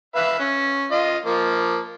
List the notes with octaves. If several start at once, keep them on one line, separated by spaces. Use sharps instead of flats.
B4 E5 F5
C#4
F4 D#5
F3 A#3